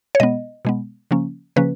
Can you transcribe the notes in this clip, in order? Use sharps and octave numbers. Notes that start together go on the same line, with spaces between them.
C#5
B2 G#3 B3 D#5
B2 G#3 B3
C#3 F3 A#3 C#4
C#3 F3 A#3 C#4 B4